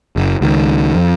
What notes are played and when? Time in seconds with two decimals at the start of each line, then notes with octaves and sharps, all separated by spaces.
0.16 F#1 F#2
0.41 C#2 D#3
0.95 F2